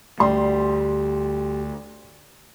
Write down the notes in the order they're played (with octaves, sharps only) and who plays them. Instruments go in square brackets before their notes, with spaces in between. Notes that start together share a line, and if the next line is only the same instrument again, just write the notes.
[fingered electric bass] D2 A3 [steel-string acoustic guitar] G3 [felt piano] C6